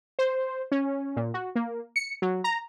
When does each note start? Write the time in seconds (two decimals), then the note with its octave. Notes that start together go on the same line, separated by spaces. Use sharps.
0.19 C5
0.72 C#4
1.16 A#2
1.34 F#4
1.56 A#3
1.96 C#7
2.22 F#3
2.44 A#5